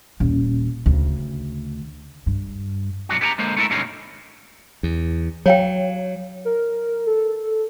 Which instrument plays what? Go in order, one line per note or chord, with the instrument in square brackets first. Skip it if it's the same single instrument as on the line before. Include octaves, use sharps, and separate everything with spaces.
[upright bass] D#1 C#4
D2 C#3
G2
[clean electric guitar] B2 F#3 D4 F#4
B3 G4 G#5 A#5
D3 G#3 A#3 C5
A3 B3 E4 A4 A#4 E5
G2 B2 D3 C4 C#4 D#4
[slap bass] E2
[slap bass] F#3 [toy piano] C#5 F5 G5
[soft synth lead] A#4
A4